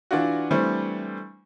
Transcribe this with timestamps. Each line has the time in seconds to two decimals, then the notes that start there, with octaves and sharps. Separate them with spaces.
0.11 E3 D4 F4 F#4
0.51 E3 G3 A3 C4 D4